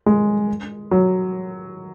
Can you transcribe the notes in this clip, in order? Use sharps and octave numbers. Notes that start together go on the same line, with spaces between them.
G#3
F#3